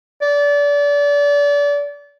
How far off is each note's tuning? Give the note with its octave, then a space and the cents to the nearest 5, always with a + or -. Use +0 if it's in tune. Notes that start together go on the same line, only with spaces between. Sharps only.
D5 -30